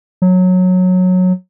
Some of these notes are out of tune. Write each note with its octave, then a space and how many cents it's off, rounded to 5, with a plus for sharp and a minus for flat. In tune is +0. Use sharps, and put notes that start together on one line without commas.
F#3 -15